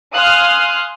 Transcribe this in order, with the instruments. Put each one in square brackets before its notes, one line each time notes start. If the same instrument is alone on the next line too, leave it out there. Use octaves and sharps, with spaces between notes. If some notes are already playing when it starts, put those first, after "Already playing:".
[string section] F5 G#5 C6 D#6 F6 F#6